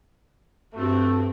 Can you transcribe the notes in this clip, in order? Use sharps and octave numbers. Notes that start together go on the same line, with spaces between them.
G2 A3 C4 F#4 G4